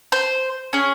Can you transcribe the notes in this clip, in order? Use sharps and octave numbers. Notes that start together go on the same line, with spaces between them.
C5
C#4 G#4